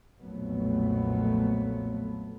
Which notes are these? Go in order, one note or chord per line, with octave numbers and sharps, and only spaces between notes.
B1 F2 A#2 F#3 A3 B3